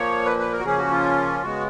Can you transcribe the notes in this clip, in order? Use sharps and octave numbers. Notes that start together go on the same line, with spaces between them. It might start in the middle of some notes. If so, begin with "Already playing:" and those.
Already playing: A#2 F3 A#3 C#5
B4
B4
A#4
F#4
C#3 F3 A#3 C#4 G#4
F#4
F4
C#3 G#3 B3 F#4